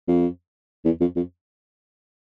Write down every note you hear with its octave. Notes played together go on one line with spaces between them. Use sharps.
F2
E2
F2
F2